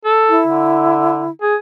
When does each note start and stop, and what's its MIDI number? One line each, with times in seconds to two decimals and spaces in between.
0.05 0.40 69
0.29 1.30 64
0.46 1.28 50
1.42 1.56 68